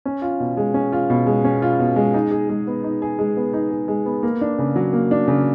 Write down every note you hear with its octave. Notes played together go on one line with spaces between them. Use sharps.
C#4
F4
B2
G#3
C#4
F4
B2
G#3
C#4
F4
B2
G#3
D#4
G#4
G#3
B3
D#4
G#4
G#3
B3
D#4
G#4
G#3
B3
A#3
D4
C#3
F#3
A#3
D4
C#3